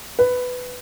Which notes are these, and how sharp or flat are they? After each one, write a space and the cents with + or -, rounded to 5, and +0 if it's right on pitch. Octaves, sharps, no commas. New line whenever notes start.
B4 +10